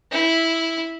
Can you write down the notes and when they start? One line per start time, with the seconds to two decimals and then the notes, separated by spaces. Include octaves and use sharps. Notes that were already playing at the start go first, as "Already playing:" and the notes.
0.11 E4